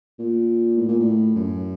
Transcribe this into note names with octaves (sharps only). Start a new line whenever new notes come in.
A#2
A2
A#2
A2
F#2